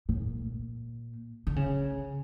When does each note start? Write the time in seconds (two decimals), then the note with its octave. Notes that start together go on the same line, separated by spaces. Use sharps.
0.09 A#2
1.47 D3
1.56 C#3